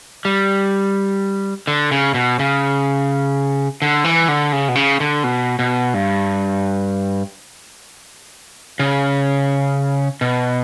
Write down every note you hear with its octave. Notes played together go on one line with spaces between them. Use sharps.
G3
D3
C#3
B2
C#3
D3
E3
D3
C#3
B2
C#3
D3
B2
B2
G2
C#3
B2